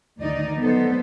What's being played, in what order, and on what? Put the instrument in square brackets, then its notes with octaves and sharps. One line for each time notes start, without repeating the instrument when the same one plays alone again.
[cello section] D2 D#3 D#4 D5 D#5
F#3 B3 A4 C5